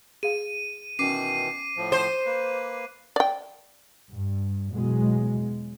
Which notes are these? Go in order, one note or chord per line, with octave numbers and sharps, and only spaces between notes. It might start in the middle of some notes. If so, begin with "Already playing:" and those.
G#4 F5 D#7
B2 D#3 E3 C#4 D6 C7 D#7
A2 F3
C5 C6
A#3 B4
D5 G5
G2
E2 B2 F#3 G#3